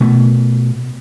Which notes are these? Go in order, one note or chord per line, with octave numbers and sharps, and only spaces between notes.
B2 A3